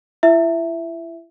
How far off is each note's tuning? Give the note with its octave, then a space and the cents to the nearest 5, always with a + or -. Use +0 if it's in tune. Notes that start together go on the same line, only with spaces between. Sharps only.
E4 +35 E5 +5